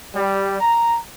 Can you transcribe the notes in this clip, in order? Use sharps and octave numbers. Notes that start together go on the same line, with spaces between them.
G3
A#5